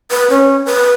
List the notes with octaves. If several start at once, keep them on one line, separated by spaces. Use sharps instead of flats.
B4
C#4
B4